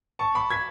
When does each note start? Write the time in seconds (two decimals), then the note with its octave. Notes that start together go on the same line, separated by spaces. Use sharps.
0.19 A5 C#6
0.35 B5 D6
0.50 G#6 B6